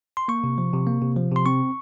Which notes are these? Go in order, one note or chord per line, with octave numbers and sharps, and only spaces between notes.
C6
A#3 C#6
C3
F3
C3
A#3
C3
F3
C3 C6
C4 C#6